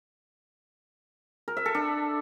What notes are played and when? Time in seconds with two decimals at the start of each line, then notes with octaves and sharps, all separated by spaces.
1.48 A#4
1.57 E5
1.66 A4
1.75 D4